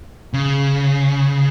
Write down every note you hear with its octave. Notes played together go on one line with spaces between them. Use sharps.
C#3